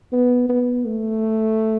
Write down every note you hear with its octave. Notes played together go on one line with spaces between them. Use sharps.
B3
B3
A3